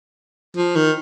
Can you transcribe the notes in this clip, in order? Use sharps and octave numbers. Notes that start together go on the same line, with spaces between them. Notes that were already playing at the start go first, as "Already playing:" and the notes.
F3
D#3